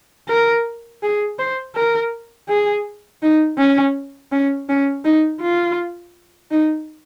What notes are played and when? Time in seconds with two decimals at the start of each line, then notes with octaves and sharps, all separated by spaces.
0.29 A#4
1.03 G#4
1.39 C5
1.76 A#4
2.48 G#4
3.23 D#4
3.58 C#4
4.32 C#4
4.69 C#4
5.05 D#4
5.41 F4
6.51 D#4